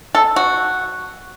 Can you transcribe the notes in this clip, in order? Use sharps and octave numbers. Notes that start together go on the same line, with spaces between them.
A4
F#4